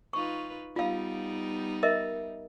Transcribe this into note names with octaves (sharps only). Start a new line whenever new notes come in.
D#4 F4 B4 C#6
G3 B3 D#4 F4 F5
A#4 D#5 E5